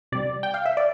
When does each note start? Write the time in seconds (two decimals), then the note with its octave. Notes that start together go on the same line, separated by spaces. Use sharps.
0.12 C3 G3 D5
0.43 G5
0.54 F5
0.66 E5
0.77 D5